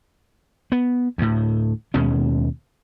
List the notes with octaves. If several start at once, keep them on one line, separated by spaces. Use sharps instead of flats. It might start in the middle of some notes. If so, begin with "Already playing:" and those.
B3
D2 A2
D#2 B2 G#3 C#4